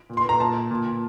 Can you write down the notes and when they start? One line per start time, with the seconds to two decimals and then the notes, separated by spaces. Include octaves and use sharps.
0.10 A#2
0.17 C6
0.24 A#2
0.29 A#5
0.40 A#2 A5
0.55 A#2
0.71 A#2
0.86 A#2